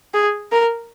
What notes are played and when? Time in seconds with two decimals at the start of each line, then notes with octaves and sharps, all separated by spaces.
0.14 G#4
0.52 A#4